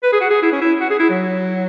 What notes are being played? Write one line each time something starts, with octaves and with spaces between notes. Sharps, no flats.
B4
G#4
F#4
G#4
E4
C#4
E4
F#4
G#4
E4
F#3